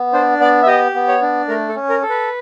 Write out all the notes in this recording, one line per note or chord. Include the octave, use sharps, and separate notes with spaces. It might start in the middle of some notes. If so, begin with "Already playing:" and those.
Already playing: B3
D4 C5
B3 D5
E5
G4 D#5
B3
C#5
D4
A3 A#4
A4
C#4
A#4
A4
B4